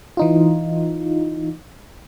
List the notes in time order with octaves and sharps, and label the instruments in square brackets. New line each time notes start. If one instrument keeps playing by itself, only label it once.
[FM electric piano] E3 D#4 F4